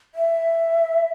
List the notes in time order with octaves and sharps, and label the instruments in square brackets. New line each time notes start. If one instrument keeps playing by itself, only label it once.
[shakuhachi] E5